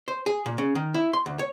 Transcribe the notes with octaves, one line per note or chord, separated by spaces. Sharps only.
C5
G#4
A#2
C#3
D#3
E4
C6
D2
C#5